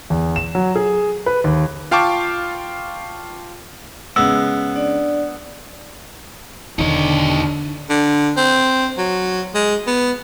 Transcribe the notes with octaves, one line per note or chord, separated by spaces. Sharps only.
E2
E7
F#3
G#4
B4
D#2
F4 F5 G5 A5 C#6 D6
C#3 G#3 B3 E6
D4 D5
E1 D3 D#3 D#4 C#5
D3
C4
F#3
G#3
B3